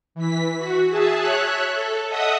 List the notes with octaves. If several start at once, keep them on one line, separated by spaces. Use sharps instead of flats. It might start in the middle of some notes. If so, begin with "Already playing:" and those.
E3 B6
F#4
G#4 E5 A5
C#5 E5 F#6
A4
D#5 E5 F#5 D#6